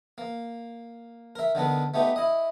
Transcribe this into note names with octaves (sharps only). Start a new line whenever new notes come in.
A#3
A#4 E5
D3 D#3 B3 A4
A3 B3 D#4 G4
E4 D#5